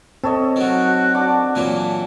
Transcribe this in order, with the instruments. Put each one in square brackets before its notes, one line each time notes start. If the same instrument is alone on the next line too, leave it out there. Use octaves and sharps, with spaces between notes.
[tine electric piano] C4 [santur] A4 C#5 D#5
[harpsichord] D#3 F#3 [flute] F#4
[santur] D4 D6
[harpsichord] A#2 E3 F#3